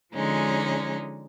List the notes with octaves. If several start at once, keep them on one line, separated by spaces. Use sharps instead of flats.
D3 F3 G#3 C#4 D#4